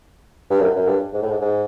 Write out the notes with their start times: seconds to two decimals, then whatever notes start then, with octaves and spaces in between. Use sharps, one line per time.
0.50 G2
0.60 F#2
0.76 F#2
0.87 G2
1.13 G#2
1.22 A2
1.30 G#2
1.41 G#2